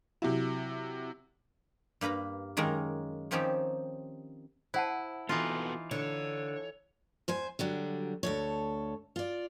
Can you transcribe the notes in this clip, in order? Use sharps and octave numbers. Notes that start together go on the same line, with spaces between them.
C3 F#3 E4
G2 A#3 B4 A#5 B5
F#2 D#3 G#3 A#3 A#4
D#3 F3 C4 C#4 D#4 G4
E4 C5 F#5 A5
E3 B3 D#4 F4 F#4 A4
D3 C#5
E2 C5 G#5
D3 F#3 G3
D2 A4 C#5
F4 D5